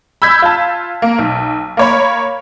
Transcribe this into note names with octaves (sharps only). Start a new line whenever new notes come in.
B5 E6 G6 G#6 B6
F4 A5
A#3
B1
A#3 C#5 B5